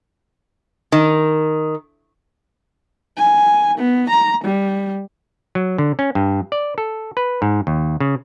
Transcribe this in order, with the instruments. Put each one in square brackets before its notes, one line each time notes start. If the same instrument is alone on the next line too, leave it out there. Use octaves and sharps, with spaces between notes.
[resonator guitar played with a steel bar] D#3
[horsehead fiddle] G#5
B3
A#5
G3
[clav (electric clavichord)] F#3
D3
C#4
G2
D5
A4
B4
G#2
D#2
C#3